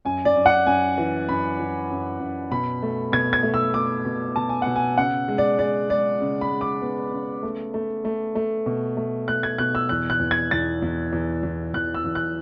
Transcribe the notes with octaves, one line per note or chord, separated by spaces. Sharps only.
F#2 G#5
D5
F#2
F#5
F#2 G#5
E3
F#2 B5
E3
F#2
F#2
B2 B5
A3
B2 G#6
G#6
A3
E6
A3 D6
B2
B2 A5
G#5
B2 F#5
G#5
C#3 F#5
G#3
D5
G#3 D5
G#3 D5
C#3
B5
G#3
D6
B3
C#3
A3
A3
A3
A3
B2
A3
A3 F#6
G#6
B2 F#6
E6
E2 F#6
F#6
E2
G#6
E2 A6
E2
E2
E2
E2 F#6
E6
E2
F#6